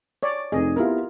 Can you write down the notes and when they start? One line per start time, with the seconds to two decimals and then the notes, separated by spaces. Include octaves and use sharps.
0.23 C#5 D5
0.52 F1 D#4 G#4 D#5
0.76 B3 E4 F4 G4 A#4